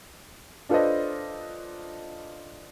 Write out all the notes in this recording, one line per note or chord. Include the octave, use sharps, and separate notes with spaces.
D4 F4 A4 B4 C5 D#5